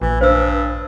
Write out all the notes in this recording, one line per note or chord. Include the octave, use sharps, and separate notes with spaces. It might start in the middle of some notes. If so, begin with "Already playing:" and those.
A#1 E3
G2 C5 E6